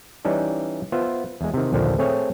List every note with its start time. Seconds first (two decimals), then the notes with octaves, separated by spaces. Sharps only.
0.25 E3 G3 C#4 D#4 D5
0.92 B3 F4 C5 E5
1.41 E2 G#3
1.54 C3 D#3
1.72 A#1 D#2 D3 F3
1.98 A3 C4 G#4 C#5